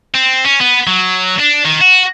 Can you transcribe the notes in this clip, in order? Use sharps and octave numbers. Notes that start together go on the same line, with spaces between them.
C4
C#4
B3
F#3
D4
D#3
F#4